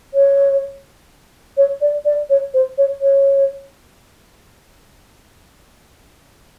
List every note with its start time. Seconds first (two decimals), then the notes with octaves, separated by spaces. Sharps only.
0.14 C#5
1.57 C#5
1.81 D5
2.05 D5
2.30 C#5
2.54 C5
2.78 C#5
3.01 C#5